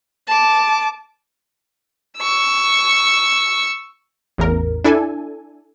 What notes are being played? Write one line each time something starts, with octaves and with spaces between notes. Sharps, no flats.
A5 D6
C#6 E6
A1 E2 A#4
D4 E4 A4 G#5